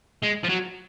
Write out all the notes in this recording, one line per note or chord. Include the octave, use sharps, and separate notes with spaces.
G#3
F3
F#3